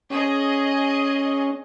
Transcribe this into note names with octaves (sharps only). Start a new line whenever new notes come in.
C#4 G#4 D#5